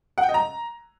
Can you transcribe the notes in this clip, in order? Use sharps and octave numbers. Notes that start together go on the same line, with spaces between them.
F#5
G5
D#5
A#5